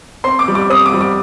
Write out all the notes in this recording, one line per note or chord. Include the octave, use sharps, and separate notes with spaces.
C4 C6
D6
G3
D6
C4 D#6
D6
G3
D6